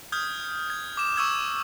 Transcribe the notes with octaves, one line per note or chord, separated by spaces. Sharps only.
D#6 F6 G6 G#6
G#6
D6 E7
C#6 D#6 E6 G#6